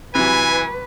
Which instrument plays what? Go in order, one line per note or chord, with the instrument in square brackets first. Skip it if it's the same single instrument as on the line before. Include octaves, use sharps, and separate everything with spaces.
[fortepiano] C3 F#3 [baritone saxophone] E3 [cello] B4 [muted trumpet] G#5